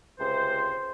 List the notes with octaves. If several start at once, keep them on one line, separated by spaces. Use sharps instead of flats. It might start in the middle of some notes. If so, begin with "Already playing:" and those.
C#2 C3 C5